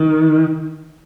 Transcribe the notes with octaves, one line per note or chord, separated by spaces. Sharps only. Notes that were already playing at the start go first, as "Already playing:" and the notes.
Already playing: D#3